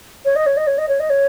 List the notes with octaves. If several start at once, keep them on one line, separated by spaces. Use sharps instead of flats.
C#5
D#5
C#5
D#5
C#5
D#5
C#5
D#5
C#5